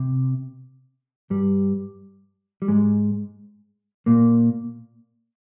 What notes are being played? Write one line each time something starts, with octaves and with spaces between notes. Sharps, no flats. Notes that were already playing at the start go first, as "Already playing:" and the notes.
Already playing: C3
G2 G3
G3
G#2 G#3
A#2 A#3